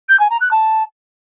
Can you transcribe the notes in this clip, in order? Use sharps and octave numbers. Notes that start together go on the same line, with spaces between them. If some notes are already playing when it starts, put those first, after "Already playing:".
G6
G#5
A#5
F#6
A5